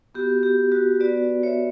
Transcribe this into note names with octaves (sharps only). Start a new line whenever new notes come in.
B3 F#4 G4
G4
F#4
B3 F#4 B4 D5
C#5 E5